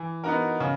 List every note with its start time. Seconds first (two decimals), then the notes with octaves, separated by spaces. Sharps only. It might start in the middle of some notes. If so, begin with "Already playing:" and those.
Already playing: E3
0.24 B3 D#4 F#4 A#4
0.60 C#3